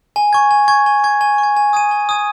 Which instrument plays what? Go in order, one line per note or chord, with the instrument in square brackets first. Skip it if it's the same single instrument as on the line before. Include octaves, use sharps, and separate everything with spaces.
[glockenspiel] G#5
C#6 G#6
G#5
C#6 G#6
G#5
C#6 G#6
G#5
C#6
G#6
G#5
D#6 G#6 D#7
G#5
D#6 G#6 D#7